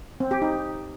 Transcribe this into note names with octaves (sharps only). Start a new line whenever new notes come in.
C4
G4
D#4